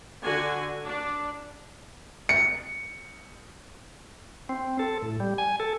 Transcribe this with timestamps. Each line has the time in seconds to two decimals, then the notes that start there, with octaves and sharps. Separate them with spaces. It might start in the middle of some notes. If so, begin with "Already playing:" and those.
0.22 D3 F#4 G#5
0.86 D4
2.29 C#7
4.49 C4
4.79 A4
5.02 A2
5.20 G3
5.38 G#5
5.60 A4